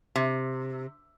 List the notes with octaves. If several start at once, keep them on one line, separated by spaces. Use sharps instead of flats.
C3